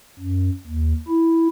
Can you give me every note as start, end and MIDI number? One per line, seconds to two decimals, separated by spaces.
0.19 0.50 42
0.67 0.93 39
1.08 1.48 64